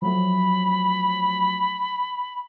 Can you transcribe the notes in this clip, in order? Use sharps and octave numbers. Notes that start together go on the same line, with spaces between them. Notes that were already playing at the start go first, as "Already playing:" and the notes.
F3 F#3 A3 B5